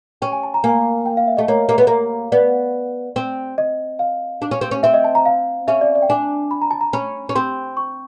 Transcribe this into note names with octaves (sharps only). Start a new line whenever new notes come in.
C#4 G5
G#5
A5
A#5
A#3 G#5
G5
F5
E5
A3 D#5
A#3 C#5
A#3
B3
A#3
B3 D5
C4
D#5
F5
D4
C#4
C4
C#4
C4 E5
D#5
A5
A#5
F5
C#4 E5
D5
D5
G5
D4 G#5
B5
A#5
A5
A#5
C#4 B5
C#4
C4 C6
C#6